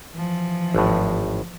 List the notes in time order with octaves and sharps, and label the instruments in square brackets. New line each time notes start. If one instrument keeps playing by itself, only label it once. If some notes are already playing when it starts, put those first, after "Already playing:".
[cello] E3 F3
[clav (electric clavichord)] G#1 A2